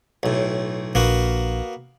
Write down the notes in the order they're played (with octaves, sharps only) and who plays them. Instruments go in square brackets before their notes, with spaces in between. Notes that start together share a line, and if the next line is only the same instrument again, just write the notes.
[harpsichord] B1 A2
[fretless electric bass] A#1 [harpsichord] A#3 B3 F#4